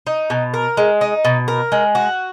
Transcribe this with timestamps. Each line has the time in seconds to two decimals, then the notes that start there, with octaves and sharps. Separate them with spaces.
0.07 D#4
0.30 B2
0.54 A#4
0.77 G#3
1.01 D#4
1.25 B2
1.48 A#4
1.72 G#3
1.95 F#4